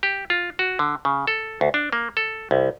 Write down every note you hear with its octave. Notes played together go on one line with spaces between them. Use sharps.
G4
F4
F#4
D3
C#3
A4
D2
D4
A#3
A4
C2